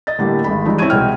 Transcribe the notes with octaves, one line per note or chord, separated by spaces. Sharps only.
D#5 A6
A2 D3 G3 A3 A#3 G4
G#1 G#3 B5
E3 F3 G3 G#3 D#4 E4
C4 E4 C#5 C#6 G#6 D#7
C2 B2 G#3 G5 F6